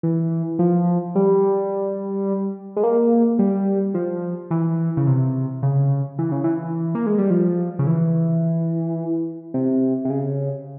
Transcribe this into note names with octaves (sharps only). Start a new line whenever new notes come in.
E3
F3
G3
G#3
A#3
G3
F3
E3
C#3
C3
C#3
E3
C#3
E3
A#3
G#3
G3
F3
C#3
E3
C3
C3
C#3